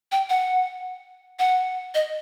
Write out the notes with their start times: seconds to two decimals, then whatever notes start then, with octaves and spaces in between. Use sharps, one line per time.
0.12 G5
0.30 F#5
1.39 F#5
1.95 D#5